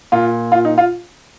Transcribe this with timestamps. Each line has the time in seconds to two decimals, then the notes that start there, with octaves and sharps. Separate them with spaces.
0.12 A#2 F4
0.52 F4
0.65 D#4
0.78 F4